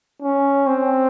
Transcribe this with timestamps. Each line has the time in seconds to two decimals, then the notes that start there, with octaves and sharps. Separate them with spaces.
0.22 C#4
0.67 C4